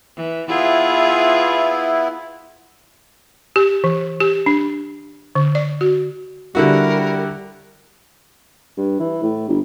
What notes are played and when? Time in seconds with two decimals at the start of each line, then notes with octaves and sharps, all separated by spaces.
0.17 E3
0.48 B3 E4 F4 G#4
3.56 G4
3.84 E3
4.20 G4
4.46 D4
5.35 D3
5.55 D5
5.81 F#4
6.55 D3 G3 E4 F#4 A#4
8.77 G2
9.00 E3
9.22 A2
9.48 G1